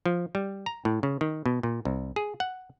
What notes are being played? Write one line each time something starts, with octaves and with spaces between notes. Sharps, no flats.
F3
G3
A#5
A2
C#3
D#3
B2
A#2
C2
G#4
F#5